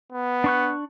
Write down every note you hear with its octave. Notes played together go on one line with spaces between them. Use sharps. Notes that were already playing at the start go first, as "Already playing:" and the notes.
B3
D4 C#6 F#6